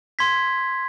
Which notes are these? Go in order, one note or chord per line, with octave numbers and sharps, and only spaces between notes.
C6 G#6 B6